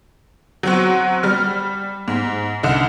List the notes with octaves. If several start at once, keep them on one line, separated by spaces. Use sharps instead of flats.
F#3 C4 F#4
G3 F6
G#2
C2 D3 D#4